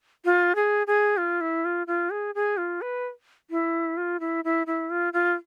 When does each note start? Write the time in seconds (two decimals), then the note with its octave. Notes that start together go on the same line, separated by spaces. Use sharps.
0.25 F4
0.55 G#4
0.87 G#4
1.17 F4
1.41 E4
1.65 F4
1.87 F4
2.10 G#4
2.35 G#4
2.57 F4
2.81 B4
3.50 E4
3.97 F4
4.20 E4
4.44 E4
4.67 E4
4.90 F4
5.13 F4